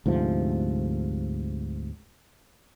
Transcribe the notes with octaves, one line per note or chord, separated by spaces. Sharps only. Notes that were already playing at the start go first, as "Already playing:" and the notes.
D2 G#2 C3 F3